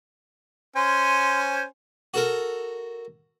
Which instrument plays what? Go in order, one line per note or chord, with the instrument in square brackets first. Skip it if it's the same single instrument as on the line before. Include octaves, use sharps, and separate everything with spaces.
[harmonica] C#4 C5 G#5 [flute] C6
[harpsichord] F#4 A4 A#4